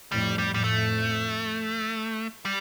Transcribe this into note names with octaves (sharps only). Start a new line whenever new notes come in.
F2 A2 G3
G3
F2 A2 G3
A3
G3